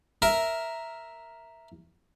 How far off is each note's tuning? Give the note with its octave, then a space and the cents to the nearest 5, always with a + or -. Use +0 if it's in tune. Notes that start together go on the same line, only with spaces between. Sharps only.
A#4 +0 E5 +0